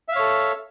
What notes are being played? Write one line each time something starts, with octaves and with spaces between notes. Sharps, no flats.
A4 C#5 E5 F5